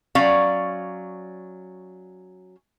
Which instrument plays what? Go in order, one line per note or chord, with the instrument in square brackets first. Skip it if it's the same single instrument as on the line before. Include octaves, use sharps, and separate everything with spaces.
[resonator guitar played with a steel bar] F#3 C#4 D5 F5